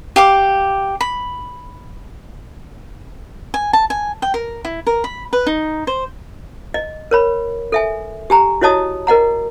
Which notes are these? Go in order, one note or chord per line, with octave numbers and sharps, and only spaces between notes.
G4 F5 D6
B5
G#5
A5
G#5
G5
A#4
E4
A#4
B5
B4
D#4
C5
D#5
A#4 C#5 B5
A4 E5 G#5
G4 G#5 A#5
E4 F#4 C#5 D#5 A5 D#6
A#4 D#5 F#5 A#5